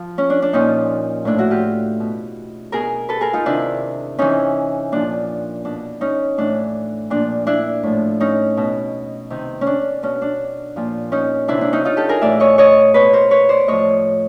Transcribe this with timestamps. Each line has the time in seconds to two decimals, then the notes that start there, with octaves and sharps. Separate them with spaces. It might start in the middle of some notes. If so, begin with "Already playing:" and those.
Already playing: F3
0.18 C#4
0.30 D4
0.42 D4
0.53 A#2 F3 C#4 D#4
1.25 A2 F3 D4 E4
1.38 E4 F#4
1.51 F4 G4
2.00 B2
2.72 B2 G#4 A#4
3.09 A4 B4
3.21 G#4 A#4
3.33 D#4 F4
3.46 C3 D#3 D4 E4
4.18 C3 E3 C#4 D#4
4.92 A#2 F3 D4
5.65 B2 D4
6.01 C#4 D#4
6.38 A2 E3 D4
7.10 A#2 F3 D4
7.47 D4 E4
7.83 A2 F3
8.20 C#4 D#4
8.57 B2
9.30 C3 D#3
9.61 C#4
9.67 D4
10.03 B2 C#4
10.22 D4
10.76 A#2 F3
11.12 C#4 D#4
11.48 C3 E3 D4 E4
11.61 D4
11.72 C#4 D#4
11.85 D#4 F4
11.97 G4 A4
12.09 G#4 A#4
12.22 A2 E3 D5 E5
12.40 C#5 D#5
12.58 C#5 D#5
12.94 B2 B4 C#5
13.13 A#4 C5
13.31 B4 C#5
13.49 C5 D5
13.68 A2 F3 C#5 D#5